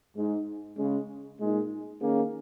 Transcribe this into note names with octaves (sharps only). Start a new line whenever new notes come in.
G#2 G#3 D#4
C#3 G#3 C#4 G#4
A#2 G#3 D#4
D#3 A#3 C#4 G#4